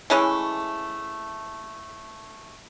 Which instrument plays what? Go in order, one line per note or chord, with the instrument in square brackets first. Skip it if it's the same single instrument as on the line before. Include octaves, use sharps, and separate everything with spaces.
[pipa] E3 G#3 A3 C#4